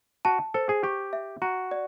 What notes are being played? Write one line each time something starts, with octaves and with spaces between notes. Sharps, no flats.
F#4 A5
A4 C5
G#4
G4 C#6
E5
F#4 A#5
D5